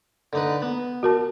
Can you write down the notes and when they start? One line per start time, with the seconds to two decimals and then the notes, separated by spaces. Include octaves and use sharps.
0.33 D3 D#4 B4
0.62 B3
1.03 F#4 A#4 A5